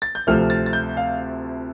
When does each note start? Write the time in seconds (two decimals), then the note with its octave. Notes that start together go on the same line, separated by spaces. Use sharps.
0.02 A6
0.15 G6
0.27 D2 C3 F3 A3 F6
0.50 A6
0.66 A6
0.73 G6
0.97 F5